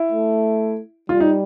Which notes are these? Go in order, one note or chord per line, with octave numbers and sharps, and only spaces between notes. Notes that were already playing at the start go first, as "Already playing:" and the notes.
Already playing: E4
A3
G3 F4
D#4